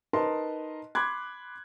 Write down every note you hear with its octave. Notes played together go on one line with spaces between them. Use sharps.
D#4 A#4 B4 D#5 A5 C6
B5 C6 D6 F#6 G#6